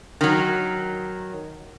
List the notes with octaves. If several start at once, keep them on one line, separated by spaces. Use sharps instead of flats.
D#3 F#3